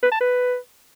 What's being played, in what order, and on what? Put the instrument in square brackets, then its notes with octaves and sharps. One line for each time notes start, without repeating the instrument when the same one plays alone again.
[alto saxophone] B4
A5
B4